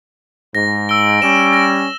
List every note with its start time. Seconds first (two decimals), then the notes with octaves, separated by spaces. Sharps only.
0.55 G#2 A#6
0.89 E6 D7 G7
1.22 G3 C#4 E7
1.53 A#6